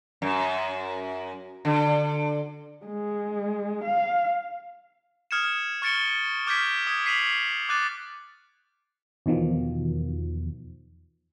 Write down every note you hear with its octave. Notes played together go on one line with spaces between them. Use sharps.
F#2
D3
G#3
F5
D#6 F6 G#6 C#7 E7
C#6 F6 A6 C#7 D7 G7
D6 F6 G6 G#6 B6 D7
D#6 G#6
B6 C7 D#7 F7 F#7
D6 F#6 A6 D#7
E2 B2 D#3 F3